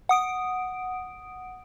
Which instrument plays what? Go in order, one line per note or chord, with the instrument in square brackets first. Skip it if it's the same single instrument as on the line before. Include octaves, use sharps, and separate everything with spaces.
[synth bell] F#5 D#6 D7